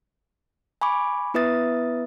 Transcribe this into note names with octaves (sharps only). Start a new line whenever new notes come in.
G#5 B5 C#6 D6
B3 E4 B4 E5 D#6 A6